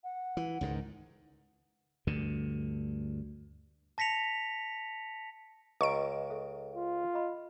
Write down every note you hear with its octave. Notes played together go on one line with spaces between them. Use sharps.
F#5
E3
C#2 G#2 D#3
D2 G2 D3
A5 A#6 B6 C#7 F7
C#2 B4 D#5 A#5 C#6 D7
A4 E5
F4
D#5 B5